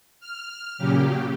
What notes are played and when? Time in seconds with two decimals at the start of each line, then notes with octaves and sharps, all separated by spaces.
0.20 F6
0.78 A#2 C#3 F#3 G4